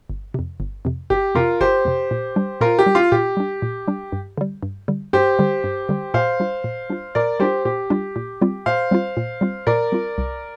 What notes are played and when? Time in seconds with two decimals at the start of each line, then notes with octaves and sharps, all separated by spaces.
0.10 G1
0.34 F2 C3
0.60 G1
0.85 F2 C3
1.10 G1 G4
1.35 F2 C3 F4 A#4
1.61 G1 G4 C5
1.85 F2 C3
2.11 A#2
2.36 G3 D4
2.61 A#2 F4 A#4
2.79 G4
2.86 G3 D4
2.95 F4
3.12 A#2 G4
3.37 G3 D4
3.62 A#2
3.88 G3 D4
4.12 G2
4.38 D3 G3
4.63 G2
4.88 D3 G3
5.13 G2 G4 C5
5.39 D3 G3
5.64 G2
5.89 D3 G3
6.14 A#2 C5 F5
6.40 G3 D4 F4
6.64 A#2
6.90 G3 D4 F4
7.15 A#2 A#4 D5
7.40 G3 D4 F4 G4 C5
7.65 A#2 G4
7.90 G3 D4 F4
8.16 A#2
8.41 G3 C4 F4
8.66 A#2 C5 F5
8.91 G3 C4 F4
9.17 A#2
9.41 G3 C4 F4
9.67 A#2 A#4 D5
9.92 G3 C4 F4
10.18 C2